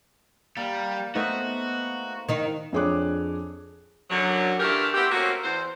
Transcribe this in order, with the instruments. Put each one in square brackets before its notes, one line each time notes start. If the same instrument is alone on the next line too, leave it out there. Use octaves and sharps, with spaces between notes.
[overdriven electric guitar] G3 [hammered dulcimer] A#3
[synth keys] A3 B3 D#4 [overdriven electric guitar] F#4 [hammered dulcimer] C5 E5
[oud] D#3 D#4
[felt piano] F2 D4 G#4 C#5 D6 F#6
[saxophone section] F#2 D3 F#3
D3 E3 A3 F4 G4 A#4
B3 C4 E4 G4
A3 A#3 C4 C#4 F#4
E2 C5